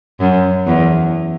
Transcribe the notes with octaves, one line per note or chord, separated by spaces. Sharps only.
F#2
E2